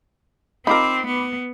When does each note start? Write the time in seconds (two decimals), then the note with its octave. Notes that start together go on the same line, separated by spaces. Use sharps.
0.67 C4 D#4 F4 A#4 B5 D6
1.05 B3